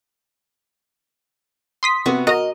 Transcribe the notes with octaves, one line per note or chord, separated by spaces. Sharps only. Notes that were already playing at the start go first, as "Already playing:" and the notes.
C6 D#6 B6
C3 B3 F#4
F#4 A#4 D#5 A#5